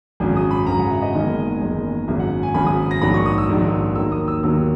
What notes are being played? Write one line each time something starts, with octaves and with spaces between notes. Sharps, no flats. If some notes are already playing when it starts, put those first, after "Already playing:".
G#1 F#2 C#3
D#6
B5
G#1 F#2 C#3 A#5
F#5
E5
D#5
F#1 E2 D#3 G#3 D#5
F#1 E2 D#3 G#3
G#1 F#2 C#3 E5
F#5
G#5
G#1 F#2 C#3 B5
D#6
A#6
A#1 G#2 D#3 F#3 B5
C#6
D#6
E6
A#1 G#2 D#3 F#3
D#2 D#3 F#3 A#3 E6
D#6
E6
D#2 D#3 F#3 A#3 E6